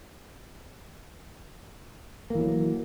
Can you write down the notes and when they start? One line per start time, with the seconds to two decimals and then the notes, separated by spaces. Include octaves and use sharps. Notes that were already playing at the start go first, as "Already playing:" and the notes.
2.30 A#3
2.35 E3
2.39 F#3